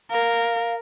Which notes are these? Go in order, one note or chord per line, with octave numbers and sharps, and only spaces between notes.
A#4 F5